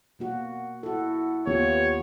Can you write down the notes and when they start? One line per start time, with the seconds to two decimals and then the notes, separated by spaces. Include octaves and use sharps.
0.19 B2 A#3 F#4
0.83 E4 F#4 A4
1.47 D#2 B3 F4 G4 C#5